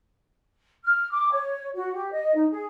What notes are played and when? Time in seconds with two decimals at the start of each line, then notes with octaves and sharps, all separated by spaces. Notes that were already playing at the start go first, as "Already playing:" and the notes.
0.84 F6
1.11 D6
1.31 C#5
1.74 F#4
1.93 G4
2.11 D#5
2.34 D#4
2.50 G#4